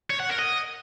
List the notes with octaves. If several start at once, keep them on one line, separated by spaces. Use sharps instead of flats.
C#5
F#5
A#4
D#5